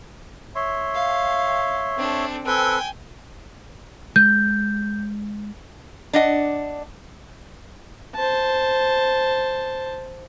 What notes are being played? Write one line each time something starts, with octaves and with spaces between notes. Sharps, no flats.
C#5 E5 C6
F5
C4 D4 A4
C4 A4 B4 G5 G#5
G#3 G6
D4 D#5 F#5
C5 A5